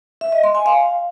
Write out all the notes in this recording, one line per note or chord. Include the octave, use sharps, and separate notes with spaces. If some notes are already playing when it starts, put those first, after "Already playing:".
E5
D#5
C6
G#5
F5